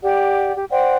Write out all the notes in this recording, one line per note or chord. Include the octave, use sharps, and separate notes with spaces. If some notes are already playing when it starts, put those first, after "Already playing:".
G4 D5 F#5
G4
C5 D5 F#5 G5